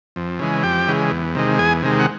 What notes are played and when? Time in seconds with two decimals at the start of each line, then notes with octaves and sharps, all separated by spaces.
0.16 F2
0.39 C#3 E3 G#3
0.63 F2 G4 G5
0.88 C#3 E3 G#3
1.11 E2
1.35 C3 D#3 G#3
1.59 E2 G#4 G#5
1.83 C3 D#3 G#3
2.00 F#5